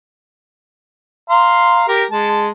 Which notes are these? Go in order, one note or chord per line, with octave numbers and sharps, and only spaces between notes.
F5 A#5 C6
G4 A#4
G#3 A5